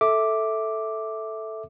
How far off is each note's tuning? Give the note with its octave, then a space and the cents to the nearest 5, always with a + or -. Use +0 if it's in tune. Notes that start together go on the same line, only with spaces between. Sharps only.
A4 +0 E5 -10 D6 +0